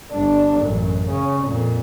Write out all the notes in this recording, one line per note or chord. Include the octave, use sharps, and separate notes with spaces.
G1 D4
A1 F#2
C#3 C#4
F2 A#2